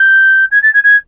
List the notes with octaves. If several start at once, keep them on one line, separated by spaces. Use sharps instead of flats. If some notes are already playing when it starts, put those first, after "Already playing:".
Already playing: G6
G#6
A6
G#6
G#6